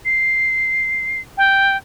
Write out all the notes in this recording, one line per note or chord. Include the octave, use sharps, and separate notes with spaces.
C7
G5